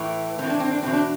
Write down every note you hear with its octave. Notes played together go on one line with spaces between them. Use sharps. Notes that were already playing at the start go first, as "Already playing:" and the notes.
Already playing: A2 E3
A2 E3 C4
D4
C4
D4
E2 B2 C4
D4